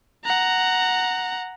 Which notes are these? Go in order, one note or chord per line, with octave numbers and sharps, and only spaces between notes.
F#5 A#5